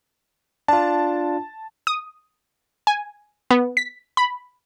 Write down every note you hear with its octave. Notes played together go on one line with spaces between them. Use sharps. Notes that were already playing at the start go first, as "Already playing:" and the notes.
D4 F4 A5
D#6
G#5
B3
B6
B5